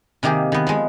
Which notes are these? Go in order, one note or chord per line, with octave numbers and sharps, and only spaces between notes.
C3 D#3 A#3 G4 G#4
D#3 B3
F3 G#3